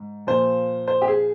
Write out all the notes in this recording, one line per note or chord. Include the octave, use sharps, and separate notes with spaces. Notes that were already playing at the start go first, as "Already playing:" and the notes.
Already playing: G#2
A#2 F3 C5
C5
G4
G#4